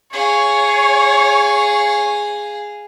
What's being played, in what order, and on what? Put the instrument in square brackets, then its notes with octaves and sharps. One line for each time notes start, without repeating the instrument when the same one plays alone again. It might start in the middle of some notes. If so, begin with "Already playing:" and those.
[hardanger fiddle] G#4 F5 [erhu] C#5